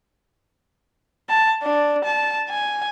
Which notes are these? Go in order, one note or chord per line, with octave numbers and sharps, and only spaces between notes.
A5
D4
A5
G#5